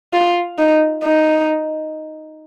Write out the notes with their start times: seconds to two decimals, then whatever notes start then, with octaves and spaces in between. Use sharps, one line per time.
0.13 F4
0.59 D#4
1.04 D#4